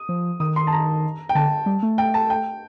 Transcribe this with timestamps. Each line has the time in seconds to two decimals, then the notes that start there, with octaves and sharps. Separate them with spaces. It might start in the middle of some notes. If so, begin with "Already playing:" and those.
Already playing: D#6
0.09 F3
0.40 D#3 D#6
0.56 C6
0.67 A5
0.72 A#5
1.29 G5
1.35 D3 A5
1.66 G3
1.83 A3
1.98 G5
2.14 A5
2.30 G5